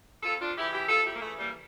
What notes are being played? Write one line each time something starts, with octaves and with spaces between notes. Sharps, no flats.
F2 F4 A4
D4 F4
C#3 E3 E4 G4
E4 G4
F2 F4 A4
E4 G4
A#3
C#3 E3 A3
G3 A#3